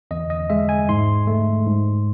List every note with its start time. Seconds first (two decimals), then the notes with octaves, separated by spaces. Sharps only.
0.11 E2 D#5
0.30 D#5
0.50 G#3 E5
0.69 G#5
0.89 G#2 C6
1.27 A3
1.66 G#2